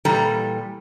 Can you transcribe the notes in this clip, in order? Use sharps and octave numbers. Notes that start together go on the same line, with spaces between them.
A#2 E3 G3 A4 A#5